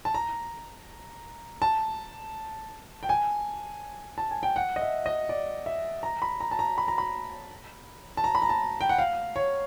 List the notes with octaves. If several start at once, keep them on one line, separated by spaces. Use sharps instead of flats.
A5
A#5
A5
G5
G#5
A5
G#5
G5
F#5
D#5
E5
D#5
D5
E5
A#5
B5
A#5
A5
A#5
B5
A#5
B5
A5
A#5
B5
A#5
A5
G5
F#5
F5
C#5